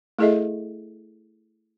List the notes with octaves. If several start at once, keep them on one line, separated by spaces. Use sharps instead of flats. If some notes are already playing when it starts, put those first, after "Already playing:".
A3 E4 G#4 A4 D#5 E5